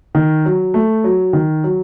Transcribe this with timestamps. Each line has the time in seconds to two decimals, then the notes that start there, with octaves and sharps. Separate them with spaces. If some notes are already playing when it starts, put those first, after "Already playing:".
0.15 D#3
0.45 F#3
0.74 A3
1.04 F#3
1.33 D#3
1.64 F#3